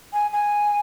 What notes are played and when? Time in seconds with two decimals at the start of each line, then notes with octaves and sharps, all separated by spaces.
0.13 G#5
0.33 G#5